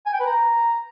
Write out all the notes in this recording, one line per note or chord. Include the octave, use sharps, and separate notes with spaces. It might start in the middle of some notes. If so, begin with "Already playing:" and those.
G#5
G5
B4
A#5